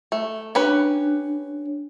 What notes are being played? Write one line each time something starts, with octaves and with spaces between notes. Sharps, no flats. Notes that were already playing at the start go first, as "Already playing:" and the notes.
A3
C#4 D4 G4 B4